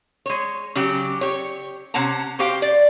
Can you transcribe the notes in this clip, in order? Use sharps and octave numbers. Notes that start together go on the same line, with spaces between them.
G#3 C#5
C#3 F#3 G4
G4 C#5
C3 C#4 F#5 A5 A#5
F#4 G4 C5 F5 G5
D5